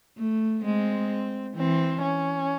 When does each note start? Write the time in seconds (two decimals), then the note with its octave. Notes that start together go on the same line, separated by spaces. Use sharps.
0.18 A3
0.64 G#3 C4
1.56 E3 C4
2.03 C#4